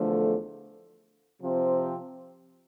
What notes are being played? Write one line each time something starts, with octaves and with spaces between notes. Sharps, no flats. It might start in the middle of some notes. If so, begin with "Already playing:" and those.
Already playing: E2 D3 F3 A3
C3 F3 C4